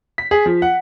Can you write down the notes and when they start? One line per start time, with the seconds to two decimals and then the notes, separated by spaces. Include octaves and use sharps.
0.18 B6
0.31 G#4
0.46 F3
0.62 F#5